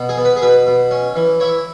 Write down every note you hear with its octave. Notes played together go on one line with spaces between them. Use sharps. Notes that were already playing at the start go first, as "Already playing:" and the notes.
Already playing: B2
G#4
B3
B4
G#4
B2 B4
B2
C#4
E3
E4 C#5